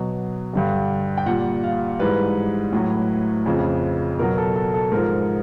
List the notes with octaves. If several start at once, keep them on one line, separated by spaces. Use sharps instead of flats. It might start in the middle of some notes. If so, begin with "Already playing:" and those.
Already playing: B2 F#3
G2 D3 G3
G5
A#2 G3 F#5
F5
G#2 E3 G3 B4
A2 F#3
F2 C#3 F3
B2 F#3 A#4
A4
A4
A4
G#2 F3 A#4